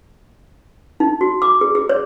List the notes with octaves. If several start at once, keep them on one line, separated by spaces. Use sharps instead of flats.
D#4
F#4
D6
G#4
G#4
C#5